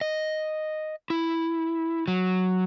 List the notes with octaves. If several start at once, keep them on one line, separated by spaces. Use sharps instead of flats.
D#5
E4
F#3